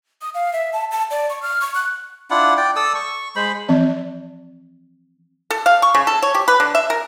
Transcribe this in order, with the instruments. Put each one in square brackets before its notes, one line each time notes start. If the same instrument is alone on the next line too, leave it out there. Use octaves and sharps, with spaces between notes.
[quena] D#6
F5
E5
A5
A5
D5
C#6
F6
C#6
F#6
[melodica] D4 E4 F4 F#5
D5 G5
A4 D5 D#6 E6
C#6
G#3 C5 B5
[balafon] E3 F3 C4 D5
[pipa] A4
F5
C#6
C#3
A4
C#5
G4
B4
D3
E5
A#4